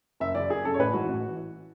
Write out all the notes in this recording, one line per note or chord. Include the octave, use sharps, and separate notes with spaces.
F#1 E5
F#2 C#3 D5
F#1 G#4
F#2 C#3 A4
C#5
A1 B4
G#2 E3 F#4
A1
E3